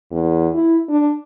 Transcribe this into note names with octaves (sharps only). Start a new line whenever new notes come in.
E2
E4
D4